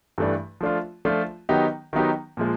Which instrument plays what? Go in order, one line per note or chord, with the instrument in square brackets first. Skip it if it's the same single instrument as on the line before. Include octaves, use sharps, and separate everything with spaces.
[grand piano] G2 E3 A3 D4
F3 A3 D4 F4
F3 A3 D4 F4
D#3 F#3 B3 D#4 G4
D#3 F#3 B3 D#4 G4
A#2 F3 G#3